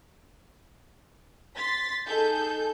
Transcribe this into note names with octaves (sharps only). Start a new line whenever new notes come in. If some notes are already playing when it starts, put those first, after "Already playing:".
C6 A6 B6
D#4 G#4 A4 G6